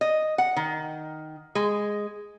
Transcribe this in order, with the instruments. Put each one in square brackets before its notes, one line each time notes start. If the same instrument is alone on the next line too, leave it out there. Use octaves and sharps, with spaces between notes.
[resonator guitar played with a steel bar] D#5
F#5
D#3
G#3